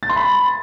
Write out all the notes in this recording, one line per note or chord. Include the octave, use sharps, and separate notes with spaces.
A6
C6
B5